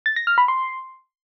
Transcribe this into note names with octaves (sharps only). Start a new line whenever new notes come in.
A6
A#6
F6
B5
C6